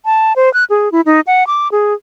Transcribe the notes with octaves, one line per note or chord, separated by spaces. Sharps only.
A5
C5
F#6
G#4
E4
D#4
F#5
D6
G#4